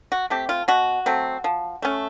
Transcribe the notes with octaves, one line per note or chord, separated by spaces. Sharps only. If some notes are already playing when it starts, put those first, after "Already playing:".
F#4
A3 C4 G4
F4
B2 F#4
F#3 A3 C4
F3
A3 C#4